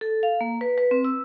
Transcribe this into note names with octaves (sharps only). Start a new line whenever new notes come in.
A4
F5
A#3
B4
B4
C4
E6